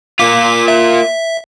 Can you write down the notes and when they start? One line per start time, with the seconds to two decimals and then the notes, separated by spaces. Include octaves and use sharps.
0.19 A#3 F4 D6 B6
0.68 E5